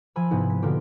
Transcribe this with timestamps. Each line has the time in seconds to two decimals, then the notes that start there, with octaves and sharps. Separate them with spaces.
0.16 F3 G#5 B5 E6
0.31 G#2 C3 B3 E4
0.50 B6
0.62 B2 D3 A#3 F4 G4